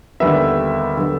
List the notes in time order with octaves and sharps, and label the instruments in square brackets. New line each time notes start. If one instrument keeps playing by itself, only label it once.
[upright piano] D#2 D3 G3 B3 E5
D3 G3 B3